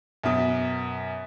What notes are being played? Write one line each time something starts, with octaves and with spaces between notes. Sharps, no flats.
F#2 B2